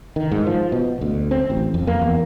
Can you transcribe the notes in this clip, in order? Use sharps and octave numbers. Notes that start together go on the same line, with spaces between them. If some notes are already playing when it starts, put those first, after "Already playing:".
D#3
G#2
F3
B2
D2
C4
A1
F2
A#3
E2